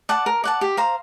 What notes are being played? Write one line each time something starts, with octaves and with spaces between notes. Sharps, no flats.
D5 F#5 A5
A#4
D5 F#5 A5
G4
C5 F5 A#5